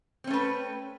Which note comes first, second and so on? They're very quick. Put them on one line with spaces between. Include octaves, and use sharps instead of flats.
C4 C#4 A3 B4